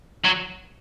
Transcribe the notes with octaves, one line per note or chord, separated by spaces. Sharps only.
F#3